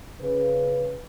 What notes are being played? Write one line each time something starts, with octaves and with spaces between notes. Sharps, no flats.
C#3 B4